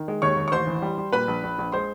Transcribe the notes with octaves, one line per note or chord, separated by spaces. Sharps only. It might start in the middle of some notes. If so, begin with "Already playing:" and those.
Already playing: D#3
G#3
D#2 C#5 C#6
D#2
C#6
A1 C5 C6
E3
G3
G3
A#2 B4 B5
A#1
A#1
A#1
G#3 C5 C6